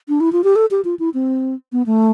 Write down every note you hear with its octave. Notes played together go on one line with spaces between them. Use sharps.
D4
E4
F4
G4
A4
G4
F4
E4
C4
B3
A3